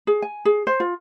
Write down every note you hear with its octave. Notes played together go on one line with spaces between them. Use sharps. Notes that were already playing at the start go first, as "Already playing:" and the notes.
G#4
G#5
G#4
C5
F4